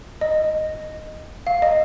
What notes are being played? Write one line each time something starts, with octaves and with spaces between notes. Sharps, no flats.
D#5
F5
D#5